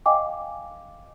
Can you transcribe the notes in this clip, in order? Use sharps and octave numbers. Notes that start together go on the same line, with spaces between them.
D#5 F5 G5 G#5 D6